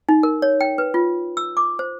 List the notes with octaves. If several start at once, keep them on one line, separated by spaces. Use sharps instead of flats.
D#4
A#4
C#5
G5
B4
F4
E6
D6
C5